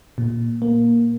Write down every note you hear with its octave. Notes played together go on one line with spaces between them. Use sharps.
A#2
A#3